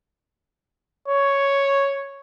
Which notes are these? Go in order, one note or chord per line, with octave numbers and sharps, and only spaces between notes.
C#5